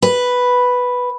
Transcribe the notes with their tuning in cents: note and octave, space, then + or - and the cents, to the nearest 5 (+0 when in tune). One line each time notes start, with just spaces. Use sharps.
B4 +0